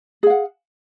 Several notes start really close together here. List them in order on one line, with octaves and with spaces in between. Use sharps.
G#4 F5 F#5